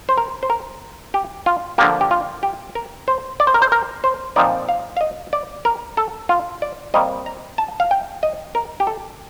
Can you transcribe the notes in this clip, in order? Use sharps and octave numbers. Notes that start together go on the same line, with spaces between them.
C5
A#4
C5
A#4
G4
F4
D3 F3 A#3 G4
G4
F4
G4
A#4
C5
D5
C5
A#4
C5
A#4
C5
A#2 F3 C4 D#4 D5
F5
F5
D#5
D5
A#4
A4
F4
D5
C3 G3 A#3 D#5
A#5
A5
F5
G5
D#5
A#4
G4
A4